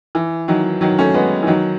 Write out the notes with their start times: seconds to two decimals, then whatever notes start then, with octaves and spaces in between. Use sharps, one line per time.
0.15 E3
0.48 D#3 F#3
0.81 D#3 F#3
0.98 A3 C#4
1.14 G#3 B3
1.43 E3
1.47 D#3 F#3